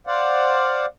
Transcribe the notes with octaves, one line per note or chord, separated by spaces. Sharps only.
C5 D5 F5 F#5